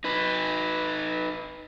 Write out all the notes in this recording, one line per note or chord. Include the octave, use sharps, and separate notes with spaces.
D#4 B4